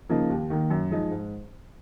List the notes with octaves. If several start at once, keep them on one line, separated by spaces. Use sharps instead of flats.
C#3 F3 A#3 D#4
D#2
D#3 A#3
F#2
F3 G#3 D#4
G#2